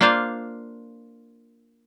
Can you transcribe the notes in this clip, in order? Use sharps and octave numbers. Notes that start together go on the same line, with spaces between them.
A#3 D4 F4 C5 F5